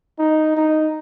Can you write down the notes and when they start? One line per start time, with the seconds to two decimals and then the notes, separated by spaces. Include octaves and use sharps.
0.18 D#4
0.56 D#4